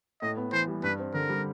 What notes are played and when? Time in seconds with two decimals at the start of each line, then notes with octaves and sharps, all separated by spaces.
0.22 A2 D#5
0.37 B3
0.53 E3 C5
0.68 G3
0.83 G2 B4
0.99 C4
1.14 D3 A#4
1.29 G3